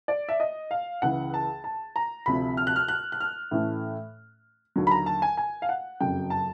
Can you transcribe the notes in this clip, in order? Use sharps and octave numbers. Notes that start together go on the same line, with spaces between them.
D5
E5
D#5
F5
C#2 C#3 E3 F#5
A5
A5
A#5
D2 C3 F3 B5
F6
F#6
F6
F#6
F#6
F6
A2 E3 A3 C#4
D#2 D3 F#3
B5
A#5
A5
G#5
G#5
F5
F#5
F#1 F2 C#3 F#3 G5
A5